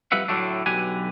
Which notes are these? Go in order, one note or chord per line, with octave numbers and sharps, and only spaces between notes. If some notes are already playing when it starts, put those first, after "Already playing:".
F2 G3 F4 B4 E5 F#5
A2 D3 F#3 A3 D4
B1 D3 F#3 G4 B4 G#5